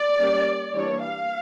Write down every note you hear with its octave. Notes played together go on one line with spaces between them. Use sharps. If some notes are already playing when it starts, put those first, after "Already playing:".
Already playing: D5
G3 A#3 C#4
E3 G3 A#3 D4 C#5
F5